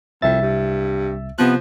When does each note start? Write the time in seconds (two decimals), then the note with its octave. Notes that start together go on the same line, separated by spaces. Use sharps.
0.22 C2 F2 E5 A6
0.42 G2
1.39 C3 F3 B3 F#6